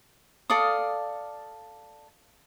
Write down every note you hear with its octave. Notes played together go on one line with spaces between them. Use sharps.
A4 D5 F5 D#6